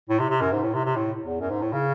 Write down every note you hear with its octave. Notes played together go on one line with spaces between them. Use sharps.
A2
C3
C3
F#2
G#2
A2
C3
C3
A2
E2
F#2
G#2
A2
C#3